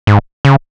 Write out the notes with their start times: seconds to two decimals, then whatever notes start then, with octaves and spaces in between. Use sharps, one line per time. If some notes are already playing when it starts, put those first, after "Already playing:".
0.07 G#2
0.45 C#3